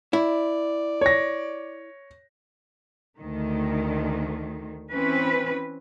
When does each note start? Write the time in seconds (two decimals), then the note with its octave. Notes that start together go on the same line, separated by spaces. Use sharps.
0.13 E4 D5
1.01 C#5 A#6
3.18 D2 D#3
4.92 E3 C4 C#4 B4